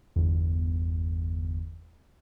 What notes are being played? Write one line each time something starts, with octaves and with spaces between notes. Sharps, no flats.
G1 E2